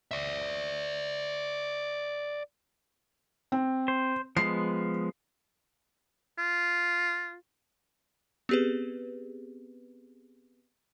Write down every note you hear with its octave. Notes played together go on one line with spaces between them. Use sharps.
D5 E5
C4
C5
F3 G#3 B3 C7
F4
B3 C4 G4 G#4 B4